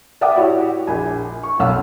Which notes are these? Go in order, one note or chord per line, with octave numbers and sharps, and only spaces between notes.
D5 E5 F#5 G5 D6 D#6
E4 F#4 G4 C#5
A#1 G#5
C#6
B1 F#2 C#4 F5 F#5 E6